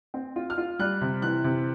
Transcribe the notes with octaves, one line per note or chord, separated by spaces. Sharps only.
C4
F4
F6
F4
G3 F#6
C3
E3 F#6
C3